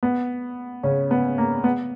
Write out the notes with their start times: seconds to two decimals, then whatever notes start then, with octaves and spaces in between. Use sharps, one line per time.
0.03 B3
0.83 C#3 C#4
1.11 B3
1.38 A#3
1.64 B3